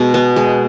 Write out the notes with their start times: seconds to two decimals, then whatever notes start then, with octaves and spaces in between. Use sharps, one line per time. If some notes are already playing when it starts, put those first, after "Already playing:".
Already playing: B2 G#3
0.14 B3
0.36 G#3